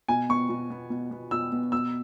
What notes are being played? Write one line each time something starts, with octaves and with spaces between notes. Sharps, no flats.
B2 G#5
B3 C#6
B2
B3
B2
B3
B2 E6
B3
B2 E6